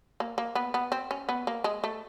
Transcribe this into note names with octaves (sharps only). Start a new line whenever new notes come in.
A#3
A#3
B3
B3
C4
C#4
B3
A#3
G#3
A3